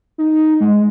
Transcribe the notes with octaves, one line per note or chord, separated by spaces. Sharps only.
D#4
G#3